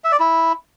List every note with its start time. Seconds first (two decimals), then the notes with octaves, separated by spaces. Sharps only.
0.04 E5
0.12 D5
0.20 E4